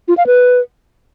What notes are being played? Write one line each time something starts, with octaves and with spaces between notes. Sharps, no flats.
F4
F5
B4